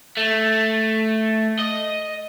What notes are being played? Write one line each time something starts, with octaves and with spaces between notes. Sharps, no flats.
A3
D#5